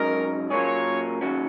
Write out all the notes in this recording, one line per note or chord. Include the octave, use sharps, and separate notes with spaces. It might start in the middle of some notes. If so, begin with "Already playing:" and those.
Already playing: G#2 F#3 C#4 G#4 A#4 D#5
A#2 F#3 A#3 C#4 G#4 C#5
D#2 C#3 F#3 C#4 F#4